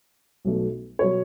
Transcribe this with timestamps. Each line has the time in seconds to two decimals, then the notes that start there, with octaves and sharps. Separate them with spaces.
0.45 B1 B2 A3
0.99 B2 F#3 C#5